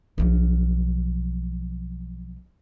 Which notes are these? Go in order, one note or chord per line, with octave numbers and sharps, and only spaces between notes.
B1 F3